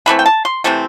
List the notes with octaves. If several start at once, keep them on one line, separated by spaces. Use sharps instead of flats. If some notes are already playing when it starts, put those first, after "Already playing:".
C3 E3 A3 C4 B5
G5
A5
C6
C3 E3 A3 C4